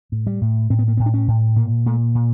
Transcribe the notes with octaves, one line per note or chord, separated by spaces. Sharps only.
A2
G3
A2
A2 C4
B3
A#3
A2 B3
D4
C#4
A2
A#2 A#3
A#2 A3
A#2